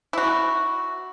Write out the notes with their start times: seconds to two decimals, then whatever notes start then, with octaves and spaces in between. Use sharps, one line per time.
0.13 E4 F#4